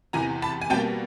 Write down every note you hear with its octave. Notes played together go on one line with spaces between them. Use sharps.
E2 C3 E3 G#5 A#5
A5 B5
G#5
B2 G3 A#3 G5 A5